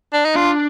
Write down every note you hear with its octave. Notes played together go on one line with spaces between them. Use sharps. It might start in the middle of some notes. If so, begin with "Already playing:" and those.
D4
D#4
D4 F4